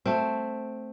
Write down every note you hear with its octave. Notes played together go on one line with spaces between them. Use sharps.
A3 C4